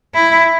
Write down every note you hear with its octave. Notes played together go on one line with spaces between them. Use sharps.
E4